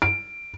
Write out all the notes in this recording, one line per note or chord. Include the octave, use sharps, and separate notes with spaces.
D7